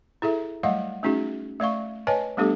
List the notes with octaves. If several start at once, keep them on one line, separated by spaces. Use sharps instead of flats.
E4 G#4 A4 E5
F#3 G3 A3 D#5 F5 F#5
A3 C#4 D#4 F#4 G#4
A3 D5 F5 C#6
B4 C#5 D#5 G#5 A5
G3 A3 B3 D4 G4 A4